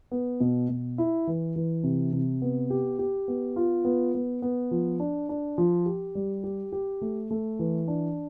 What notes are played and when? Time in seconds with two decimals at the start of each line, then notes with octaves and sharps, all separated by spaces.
0.11 B3
0.40 B2
0.69 B2
0.98 E4
1.27 E3
1.56 E3
1.84 C3
2.13 C3
2.42 B3
2.70 G4
2.99 G4
3.28 B3
3.56 F4
3.85 B3
4.15 B3
4.42 B3
4.71 F3
5.00 D4
5.29 D4
5.58 F3
5.86 G4
6.15 G3
6.44 G4
6.72 G4
7.02 A3
7.31 A3
7.59 E3
7.88 D4